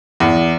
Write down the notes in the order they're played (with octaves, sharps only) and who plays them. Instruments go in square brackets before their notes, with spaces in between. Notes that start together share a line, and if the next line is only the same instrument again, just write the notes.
[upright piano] E2